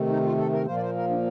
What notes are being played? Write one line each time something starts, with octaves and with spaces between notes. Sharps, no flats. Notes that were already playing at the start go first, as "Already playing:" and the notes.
Already playing: C3 D#3 A3
D#4
F4
A4
A#4
A#2 F3 A#3 C5
D5
C5
A#4
D4